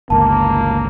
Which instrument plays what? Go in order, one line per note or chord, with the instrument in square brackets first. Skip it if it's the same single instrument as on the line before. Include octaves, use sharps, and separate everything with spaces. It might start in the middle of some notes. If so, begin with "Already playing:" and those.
[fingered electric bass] G1 C#2 [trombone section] A#3 [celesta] A5